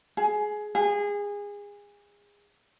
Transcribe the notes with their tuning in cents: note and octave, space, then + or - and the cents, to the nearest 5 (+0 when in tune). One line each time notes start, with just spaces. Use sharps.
G#4 +15
G#4 -25